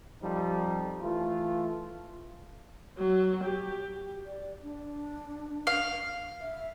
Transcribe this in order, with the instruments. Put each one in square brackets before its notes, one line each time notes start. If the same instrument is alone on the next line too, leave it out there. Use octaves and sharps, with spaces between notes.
[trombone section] F2 F3 G3 D#4
E3 A3 F4
[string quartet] F#3
G4
[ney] D5
D4
[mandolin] F5
[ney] E5